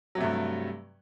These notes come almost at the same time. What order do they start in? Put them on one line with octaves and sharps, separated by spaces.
F#3 C3 A3 G2